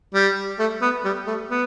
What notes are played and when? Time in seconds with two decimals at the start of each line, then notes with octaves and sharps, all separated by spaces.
0.14 G3
0.59 A3
0.82 B3
1.04 G3
1.27 A3
1.51 B3